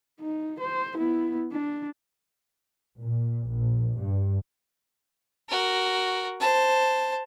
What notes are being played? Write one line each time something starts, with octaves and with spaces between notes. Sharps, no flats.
D#4
C5
B3 E4
D4
A#2
A#1
G2
F#4 A#4
C5 A5